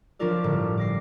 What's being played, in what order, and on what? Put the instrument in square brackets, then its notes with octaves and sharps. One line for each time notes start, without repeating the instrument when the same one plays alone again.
[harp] F3 C#4 D4 F4 A#4 D5
G1 A2 D3
D6 A#6 C7